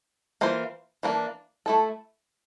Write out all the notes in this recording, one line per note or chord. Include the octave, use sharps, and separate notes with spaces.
E3 A#3 F4 C5
E3 A#3 D4
A3 E4 A4